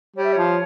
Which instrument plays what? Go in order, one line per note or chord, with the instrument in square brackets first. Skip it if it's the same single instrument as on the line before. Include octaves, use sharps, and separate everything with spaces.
[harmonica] G3 [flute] C#5
[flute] E5
[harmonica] F3 [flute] C#5